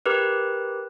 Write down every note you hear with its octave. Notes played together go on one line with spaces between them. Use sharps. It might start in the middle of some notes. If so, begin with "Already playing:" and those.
G4 A#4 B4